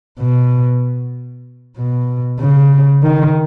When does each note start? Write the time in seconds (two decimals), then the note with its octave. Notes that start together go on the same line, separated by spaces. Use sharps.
0.19 B2
1.77 B2
2.40 C#3
3.03 D#3